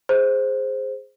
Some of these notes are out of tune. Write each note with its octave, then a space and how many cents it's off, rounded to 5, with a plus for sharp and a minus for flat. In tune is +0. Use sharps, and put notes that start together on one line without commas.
G#4 +0 C5 +0